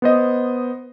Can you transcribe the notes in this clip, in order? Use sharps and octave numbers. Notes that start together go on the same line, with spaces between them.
B3 C5 D#5